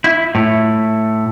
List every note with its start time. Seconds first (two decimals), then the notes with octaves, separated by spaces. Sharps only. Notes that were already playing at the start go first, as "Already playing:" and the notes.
0.04 E4
0.35 A2